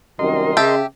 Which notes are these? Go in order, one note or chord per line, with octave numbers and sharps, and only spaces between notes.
C2 F#2 D#3 A#4 D#5 C6
C#3 G4 E5 A5